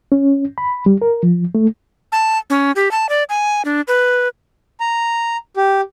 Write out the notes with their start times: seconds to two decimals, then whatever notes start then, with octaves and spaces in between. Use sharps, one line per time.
0.12 C#4
0.58 B5
0.86 G3
1.02 A#4
1.23 F3
1.55 A3
2.12 A5
2.50 C#4
2.76 G4
2.91 A5
3.09 D5
3.29 G#5
3.65 D4
3.88 B4
4.80 A#5
5.57 G4